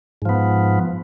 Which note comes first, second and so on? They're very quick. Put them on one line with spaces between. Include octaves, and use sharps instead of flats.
G#2 F3 B3